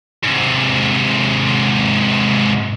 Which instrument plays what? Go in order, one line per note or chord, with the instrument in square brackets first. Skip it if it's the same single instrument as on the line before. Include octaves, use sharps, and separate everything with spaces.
[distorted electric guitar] G#2 C3